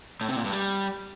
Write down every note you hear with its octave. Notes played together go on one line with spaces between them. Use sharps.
A2
C3
A#2
G2
G3